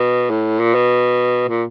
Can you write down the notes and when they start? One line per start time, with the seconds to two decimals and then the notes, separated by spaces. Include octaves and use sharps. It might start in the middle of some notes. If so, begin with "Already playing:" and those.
Already playing: B2
0.30 A2
0.60 A#2
0.74 B2
1.49 A#2